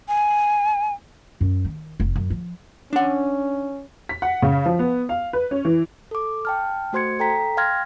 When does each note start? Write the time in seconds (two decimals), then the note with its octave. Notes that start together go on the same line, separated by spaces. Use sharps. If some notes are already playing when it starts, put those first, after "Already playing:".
0.08 G#5
1.41 F#2
1.65 D#3
2.00 F1
2.16 F#2
2.30 F3
2.93 C#4 D4 F#5
4.09 B6
4.22 F#5
4.42 C#3
4.66 F3
4.79 B3
5.09 F5
5.33 B4
5.51 C#4
5.65 E3
6.11 A4 D6
6.45 G5 A5 F6
6.93 A3 F#4 C5 C6 G#6 C#7
7.19 A4 G5 A#5 B6
7.57 F5 G5 C6 F6 G#6 A#6